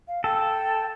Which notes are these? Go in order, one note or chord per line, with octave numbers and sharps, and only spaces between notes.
F5
A4 G5